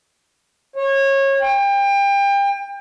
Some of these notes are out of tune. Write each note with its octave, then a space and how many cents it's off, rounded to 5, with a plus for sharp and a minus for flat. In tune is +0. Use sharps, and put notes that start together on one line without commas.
C#5 -25
G5 +30